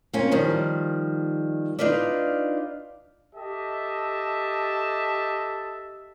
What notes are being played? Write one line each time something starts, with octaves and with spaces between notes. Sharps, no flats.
A#3 C4 C#4 F4
D#3 F3 G3
D4 D#4 F4 B4 D5
G4 A4 D#5 E5 A5